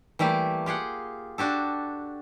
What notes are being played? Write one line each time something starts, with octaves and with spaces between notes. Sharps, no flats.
E3 G3 A3 A#3 G4
F4 G4 G#4 F#5
D4 F#4 G4 A4